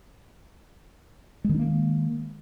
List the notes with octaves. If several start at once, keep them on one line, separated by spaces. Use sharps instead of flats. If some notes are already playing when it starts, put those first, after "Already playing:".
D#3 G#3 A#3 D4